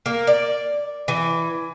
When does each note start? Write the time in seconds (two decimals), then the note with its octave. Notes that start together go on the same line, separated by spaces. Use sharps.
0.06 A#3
0.27 D5
1.08 E3